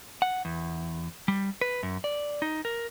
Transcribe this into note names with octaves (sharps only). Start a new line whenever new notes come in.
F#5
E2
G3
B4
F#2
D5
D#4
A#4